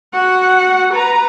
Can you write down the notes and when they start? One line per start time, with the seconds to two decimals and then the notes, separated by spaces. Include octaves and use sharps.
0.13 F#4 F#5
0.93 B4 A#5